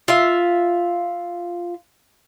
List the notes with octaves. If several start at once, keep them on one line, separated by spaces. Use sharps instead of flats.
F4 E5